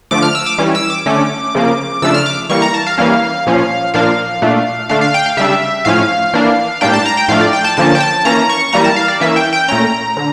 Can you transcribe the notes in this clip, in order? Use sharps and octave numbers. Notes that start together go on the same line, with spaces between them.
D3 F3 A3 D6
F6
E6
D6
E3 G3 C#4
E6
D6
D3 A3 C#4
C#3 F3 A#3
C#3 F3 A3 D4 E6
F6
D6
E3 G3 A#3 C#6
A#5
A5
F5
E3 G3 A#3 C#4
A#2 F3 C#4
A#2 F3 A#3 D4 F5
A#2 A3 D4
D3 A3 D4 F5
F5
G5
F5
C#3 G3 D4 E5
A2 F3 C#4 F5
E3 A#3 D4
A2 G3 A#3 D4 G5
A5
A#5
G5
A2 F3 A3 D4 F5
D5
G5
A5
D3 F3 A#3 C#4 A5
G5
A5
E3 A#3 C#4 A#5
C#6
E3 G3 A#3 A#5
A5
F5
D5
E3 A#3 C#4 E5
G5
G5
A#2 A3 C#4 A#5
D3